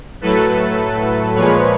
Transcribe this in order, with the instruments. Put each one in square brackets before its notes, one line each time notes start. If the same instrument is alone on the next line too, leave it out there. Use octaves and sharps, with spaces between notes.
[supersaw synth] A2 F#3 A3 A4 B4
A#2 F3 G#3 B4 C#5